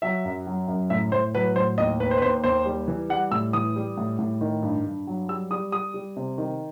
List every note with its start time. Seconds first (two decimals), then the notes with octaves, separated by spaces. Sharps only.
0.02 F#3 E5
0.25 F#2
0.47 F#3
0.68 F#2
0.90 A2 E5
1.12 A2 C5
1.34 F#3 B4
1.56 A2 C5
1.78 D#2 D#5
2.00 D#2 B4
2.11 C5
2.17 B4
2.22 D#2 C5
2.44 D#2 C5
2.66 G3
2.88 E3
3.09 G3 F#5
3.31 A2 E6
3.53 E3 D#6
3.76 G3
3.97 A2
4.19 A2
4.41 D#3
4.63 G2
4.86 G2
5.07 F#3
5.29 G3 E6
5.51 G3 D#6
5.72 G3 D#6
5.94 G3
6.16 C3
6.38 D#3